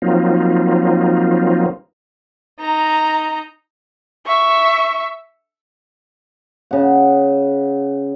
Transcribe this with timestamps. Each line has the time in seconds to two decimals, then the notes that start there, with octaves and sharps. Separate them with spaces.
0.02 F3 F#3 A#3 C4 D#4 F4
2.60 D#4 A#5
4.26 E5 C#6
6.71 C#3 F#5